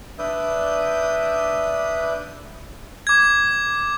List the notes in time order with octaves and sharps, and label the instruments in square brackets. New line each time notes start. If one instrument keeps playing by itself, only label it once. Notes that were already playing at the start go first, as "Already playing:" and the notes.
[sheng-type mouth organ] D4 B4 D5 E5 D#6 G6
[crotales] D6 G#6